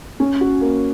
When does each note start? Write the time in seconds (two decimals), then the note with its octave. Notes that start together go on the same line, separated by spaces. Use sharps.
0.20 C#4
0.41 F#4
0.61 A#3